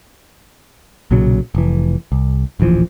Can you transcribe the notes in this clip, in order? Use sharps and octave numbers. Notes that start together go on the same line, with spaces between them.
B1 A#2 C#3 F#3
F1 E3
C2
D1 A#1 E3 F3